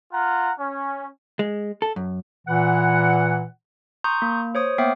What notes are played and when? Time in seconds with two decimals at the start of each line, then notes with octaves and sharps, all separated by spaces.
0.13 F4 F5 F#5 A#5
0.60 C#4
1.39 G#3
1.82 A4
1.96 F#2
2.47 A#2 E3 F#5
4.04 A#5 C6 C#6 D#6 G6
4.22 A#3
4.55 C5 C#5 D#6
4.78 A#3 B3 E5 G5 D6 C7